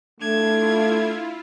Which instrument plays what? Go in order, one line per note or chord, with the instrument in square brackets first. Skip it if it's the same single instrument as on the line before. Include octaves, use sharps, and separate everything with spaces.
[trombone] A3 [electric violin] D4 G#6 [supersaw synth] E4 F4